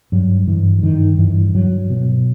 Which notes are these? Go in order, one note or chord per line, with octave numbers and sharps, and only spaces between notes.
G2 F#3
G2 E3
G2 D#3
G2 E3
G2 F#3
B2